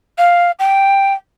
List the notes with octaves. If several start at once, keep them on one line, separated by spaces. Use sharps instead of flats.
F5
G5